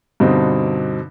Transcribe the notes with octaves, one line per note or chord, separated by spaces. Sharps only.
G2 B2 D3 C4 D#4